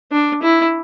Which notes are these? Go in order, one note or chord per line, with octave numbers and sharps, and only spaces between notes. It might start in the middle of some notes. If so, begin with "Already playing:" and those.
D4
E4